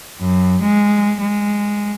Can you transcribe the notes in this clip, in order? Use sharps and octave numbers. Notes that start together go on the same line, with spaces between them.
F#2
G#3
G#3